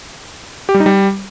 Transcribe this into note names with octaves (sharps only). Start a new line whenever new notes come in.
G4
G3
D#4
G3